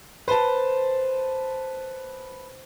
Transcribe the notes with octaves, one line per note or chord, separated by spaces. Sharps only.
B4 C5 A5